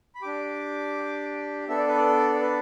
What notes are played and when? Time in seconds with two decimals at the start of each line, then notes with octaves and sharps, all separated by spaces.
0.15 B5
0.22 D4 G4 D6
1.68 B3 D4 A4 E5
1.78 D5
1.87 B4
1.96 D5
2.34 D5
2.41 B4